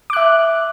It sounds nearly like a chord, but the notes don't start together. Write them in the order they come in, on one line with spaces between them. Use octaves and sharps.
D6 F#6 E5